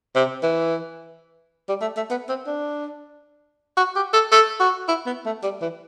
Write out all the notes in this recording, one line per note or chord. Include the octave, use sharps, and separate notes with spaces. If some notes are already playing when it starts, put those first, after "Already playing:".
C3
E3
G3
A3
A3
B3
C4
D4
F#4
G4
A4
A4
F#4
E4
B3
A3
G3
E3